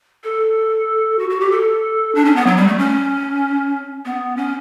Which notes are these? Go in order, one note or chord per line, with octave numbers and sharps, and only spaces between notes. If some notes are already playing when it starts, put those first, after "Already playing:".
A4
F#4
F#4
G4
A4
D4
C#4
B3
F#3
G3
A3
C#4
B3
C#4